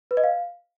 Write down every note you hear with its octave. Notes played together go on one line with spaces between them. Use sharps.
B4
D#5
F5